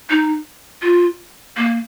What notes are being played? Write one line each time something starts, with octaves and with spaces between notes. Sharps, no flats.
D#4
F4
A#3